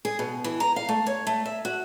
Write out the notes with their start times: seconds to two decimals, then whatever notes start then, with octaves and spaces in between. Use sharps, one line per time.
0.05 G#4
0.19 B2
0.44 E3
0.60 A#5
0.76 F5
0.89 A3
1.06 C#5
1.27 A3
1.46 E5
1.65 F#4